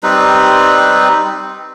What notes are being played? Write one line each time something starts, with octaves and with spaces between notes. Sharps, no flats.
G3 C4 D#4 B4